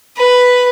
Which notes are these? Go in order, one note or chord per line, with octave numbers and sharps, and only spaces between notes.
B4